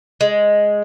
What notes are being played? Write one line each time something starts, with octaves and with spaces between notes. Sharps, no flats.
G#3